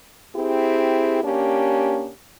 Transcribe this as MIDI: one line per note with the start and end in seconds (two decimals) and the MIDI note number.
0.35 1.23 60
0.35 1.23 64
0.35 1.23 67
0.35 1.23 68
1.23 2.11 58
1.23 2.11 61
1.23 2.11 62
1.23 2.11 67